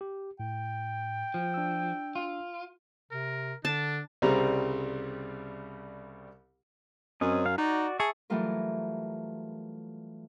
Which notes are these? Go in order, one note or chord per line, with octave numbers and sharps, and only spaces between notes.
G4
A2 G5
F3
D4 E6
F4
C3 A#4
D3 D4 A5
C2 C#3 G3 C4 A#5
F#2 C4 C#4 D#5
F5
D#4 F#4 D5
G#4 E5 A5 C#6
E3 F#3 G3 A3 F4 A#4